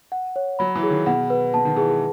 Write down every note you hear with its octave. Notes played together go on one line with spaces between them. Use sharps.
F#5
C#5
F#3 B5
E3
G#4
D#3
B2 F#5
B4
B2 A5
D#3
E3 G#4
G#3